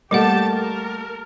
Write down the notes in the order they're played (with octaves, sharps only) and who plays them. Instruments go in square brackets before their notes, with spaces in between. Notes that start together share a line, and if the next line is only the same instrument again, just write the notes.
[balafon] G3 D5 F#5 [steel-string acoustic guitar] A3 A#3 [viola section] G4 A5
[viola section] A#4